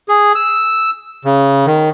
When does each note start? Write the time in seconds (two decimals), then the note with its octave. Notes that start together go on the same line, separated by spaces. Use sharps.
0.09 G#4
0.35 E6
1.25 C#3
1.66 D#3